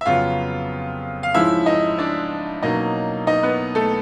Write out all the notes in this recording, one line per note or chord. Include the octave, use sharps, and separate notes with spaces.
E5
F2 C#3 F#3 B3 F4 F5
F5
G#2 F3 G#3 C#4 E4 E5
D#4 D#5
D4 D5
B2 F#3 A#3 C#4 D#4 D#5
D#4 D#5
B3 B4
A3 A4